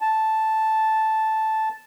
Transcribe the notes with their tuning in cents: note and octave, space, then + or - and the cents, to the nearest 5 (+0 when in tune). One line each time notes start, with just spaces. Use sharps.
A5 -5